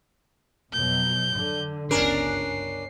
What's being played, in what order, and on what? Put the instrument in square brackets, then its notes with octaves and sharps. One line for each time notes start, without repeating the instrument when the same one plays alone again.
[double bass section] F2 B2 F#3 [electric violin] G6
[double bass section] D3
[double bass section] G1 C#2 [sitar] C#4 D4 A#4 [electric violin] C7